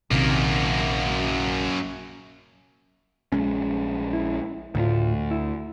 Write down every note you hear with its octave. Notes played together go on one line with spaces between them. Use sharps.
A#1 F#2 C3 D#3 A#3
A#1 G#3 C#4
E4
D2 A2 F4
E4